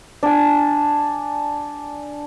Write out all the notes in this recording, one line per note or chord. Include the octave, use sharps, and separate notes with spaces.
D4 G#5